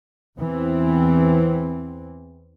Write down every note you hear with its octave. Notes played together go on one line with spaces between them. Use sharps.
E2 E3 C4